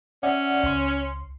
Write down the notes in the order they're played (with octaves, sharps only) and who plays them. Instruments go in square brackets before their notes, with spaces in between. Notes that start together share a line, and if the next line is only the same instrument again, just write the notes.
[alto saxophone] C#4 [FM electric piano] D5 E5 F#5
[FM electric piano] C#2 C6